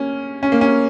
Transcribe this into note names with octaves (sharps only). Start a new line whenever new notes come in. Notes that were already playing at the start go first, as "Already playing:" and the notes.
Already playing: A#3 C#4
C#4
A#3
C#4